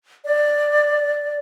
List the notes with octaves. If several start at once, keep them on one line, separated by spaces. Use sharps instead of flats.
D5